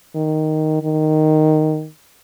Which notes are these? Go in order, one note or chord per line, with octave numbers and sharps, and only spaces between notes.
D#3
D#3